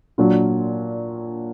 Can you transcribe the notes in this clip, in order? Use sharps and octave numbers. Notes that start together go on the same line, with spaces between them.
A#2 F#3 D4 F4